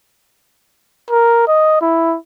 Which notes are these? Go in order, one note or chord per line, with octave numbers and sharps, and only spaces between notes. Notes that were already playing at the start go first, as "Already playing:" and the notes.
A#4
D#5
E4